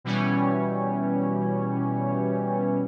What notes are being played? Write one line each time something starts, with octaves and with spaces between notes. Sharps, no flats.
B2 E3 G3 C#4